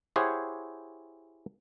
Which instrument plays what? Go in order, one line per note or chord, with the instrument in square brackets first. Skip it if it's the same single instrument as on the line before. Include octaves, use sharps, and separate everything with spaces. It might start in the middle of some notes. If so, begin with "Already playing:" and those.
[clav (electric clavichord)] E4 G4 G#4 C5 C#5 F#5